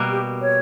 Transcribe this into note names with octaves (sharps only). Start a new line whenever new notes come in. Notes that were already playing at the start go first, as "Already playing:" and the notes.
Already playing: B2 G3 A#3
G4
C#5